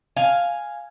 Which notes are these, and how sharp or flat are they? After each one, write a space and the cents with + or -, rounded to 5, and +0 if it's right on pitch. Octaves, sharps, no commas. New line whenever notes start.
F5 +0 G#5 +0